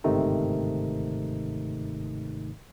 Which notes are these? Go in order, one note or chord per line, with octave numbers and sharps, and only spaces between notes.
G1 G#2 C3 D#3 A3 D#4